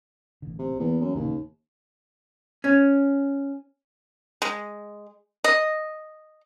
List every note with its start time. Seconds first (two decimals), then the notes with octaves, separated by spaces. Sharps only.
0.42 A1 D3
0.59 C3
0.79 E2 E3 A#3
1.01 F#2
1.15 D#1 A1 D#2 C#3
2.64 C#4
4.42 G#3
5.44 D#5